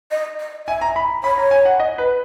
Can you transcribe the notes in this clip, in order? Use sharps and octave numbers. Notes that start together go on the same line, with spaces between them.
D#5
D#5
E5 G#5
A#5
B5
C#5 B5
A#5
G#5
F#5
D#5
B4